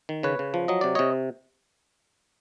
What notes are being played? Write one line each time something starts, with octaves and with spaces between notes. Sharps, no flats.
D#3
C#3 B4 C#5
C#3
F3
F#3 D#5
C3 D5
C3 C#5 D#5